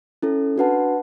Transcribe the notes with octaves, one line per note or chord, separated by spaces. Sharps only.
C#4 E4 A4
D4 F#4 B4 F#5 A5